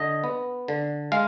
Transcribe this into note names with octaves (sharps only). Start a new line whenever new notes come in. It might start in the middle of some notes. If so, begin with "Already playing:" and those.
Already playing: D3 D#5
B3
D3
G#3 F5